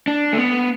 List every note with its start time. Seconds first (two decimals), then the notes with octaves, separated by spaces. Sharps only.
0.08 D4
0.33 A3
0.38 B3